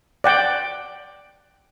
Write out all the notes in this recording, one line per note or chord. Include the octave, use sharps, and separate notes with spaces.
D5 F#5 G5